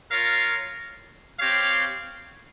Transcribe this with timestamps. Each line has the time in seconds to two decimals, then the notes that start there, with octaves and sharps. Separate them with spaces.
0.11 F4 A#4 C#5 F5
1.38 C4 G4 C#5 F5